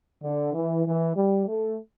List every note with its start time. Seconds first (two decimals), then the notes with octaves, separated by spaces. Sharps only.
0.22 D3
0.53 E3
0.85 E3
1.16 G3
1.47 A3